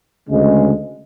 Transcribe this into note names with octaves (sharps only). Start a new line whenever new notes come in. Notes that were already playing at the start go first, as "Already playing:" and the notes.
D2 C#3 G#3